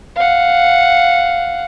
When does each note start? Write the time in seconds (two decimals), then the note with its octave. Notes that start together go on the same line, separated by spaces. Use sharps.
0.16 F5 F#5